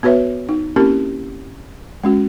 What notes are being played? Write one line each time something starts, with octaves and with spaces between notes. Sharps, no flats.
B3 F#4 B4 C#5 E5
D#4
A#3 C4 C#4 E4 G4 A#4
G#3 C#4 F#4